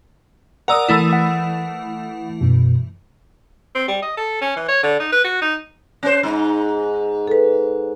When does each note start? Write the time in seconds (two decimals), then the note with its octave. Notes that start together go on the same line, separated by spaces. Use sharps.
0.68 A#4 D5 F#5 A#5 D#6 E6
0.89 E3 A3 E4
1.10 F#5 D#6
2.41 F#2 B2
3.75 C4
3.88 G3
4.03 D#5
4.17 A4
4.41 C#4
4.57 E3
4.68 C#5
4.83 D3
5.00 D#4
5.12 B4
5.24 F#4
5.42 D#4
6.03 C#4 C5
6.23 G#2 D#4
7.27 A4 B4